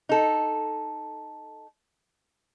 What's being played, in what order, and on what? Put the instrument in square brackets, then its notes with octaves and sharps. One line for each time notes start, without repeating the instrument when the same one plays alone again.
[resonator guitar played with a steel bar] D#4 A4